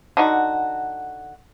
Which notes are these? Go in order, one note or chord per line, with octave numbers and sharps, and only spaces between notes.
D3 D#4 F#4